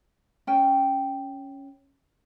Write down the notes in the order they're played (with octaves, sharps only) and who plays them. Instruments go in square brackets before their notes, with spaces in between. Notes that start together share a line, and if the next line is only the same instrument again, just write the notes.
[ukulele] C#4 G5